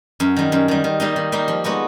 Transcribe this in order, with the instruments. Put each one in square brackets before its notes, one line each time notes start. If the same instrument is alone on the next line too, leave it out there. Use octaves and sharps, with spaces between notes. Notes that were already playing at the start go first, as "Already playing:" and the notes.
[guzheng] F#2
D#3 G3
F#2
D#3 G3
D#3
G3 A#3 D#4
D#3
G3 A#3 D#4
F3
G#3 B3 D#4 F#4